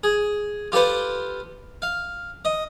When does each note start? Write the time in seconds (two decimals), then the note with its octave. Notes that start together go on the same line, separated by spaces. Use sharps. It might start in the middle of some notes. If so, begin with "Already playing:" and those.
0.03 G#4
0.72 F4 G4 A4 B4 C5
1.82 F5
2.45 D#5